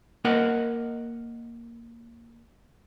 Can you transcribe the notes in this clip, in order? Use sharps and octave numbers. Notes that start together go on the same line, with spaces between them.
A#3 A#4 D#5 F#5